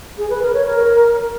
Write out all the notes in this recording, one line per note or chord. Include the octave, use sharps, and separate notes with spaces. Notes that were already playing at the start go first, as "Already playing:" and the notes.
G#4
B4
A#4
C#5
A#4